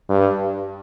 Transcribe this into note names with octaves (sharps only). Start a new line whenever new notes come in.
G2